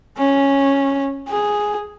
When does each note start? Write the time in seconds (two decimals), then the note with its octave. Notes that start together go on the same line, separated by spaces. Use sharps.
0.18 C#4
1.29 G#4